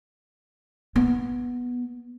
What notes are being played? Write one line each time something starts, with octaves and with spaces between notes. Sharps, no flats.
B3